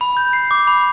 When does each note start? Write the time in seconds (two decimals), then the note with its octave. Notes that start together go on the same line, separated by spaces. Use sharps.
0.01 B5
0.17 G6
0.33 C7
0.51 D6
0.67 B5